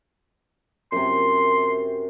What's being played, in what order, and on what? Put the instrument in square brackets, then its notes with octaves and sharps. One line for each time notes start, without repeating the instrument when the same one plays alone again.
[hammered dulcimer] F#2 C3 [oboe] C6